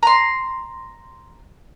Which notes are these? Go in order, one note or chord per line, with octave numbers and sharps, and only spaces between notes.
A#5 C6